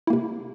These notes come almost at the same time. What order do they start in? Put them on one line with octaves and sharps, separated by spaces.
E4 A#3 C3